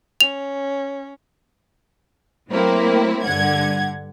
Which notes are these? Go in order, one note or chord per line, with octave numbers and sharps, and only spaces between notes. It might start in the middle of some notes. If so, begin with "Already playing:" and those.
C#4 F7
F#3 A3 A#3 C4 E4
G2 D3 F#5 G#6